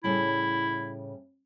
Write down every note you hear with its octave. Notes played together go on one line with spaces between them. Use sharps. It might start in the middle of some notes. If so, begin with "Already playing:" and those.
A2 C#3 G3 E4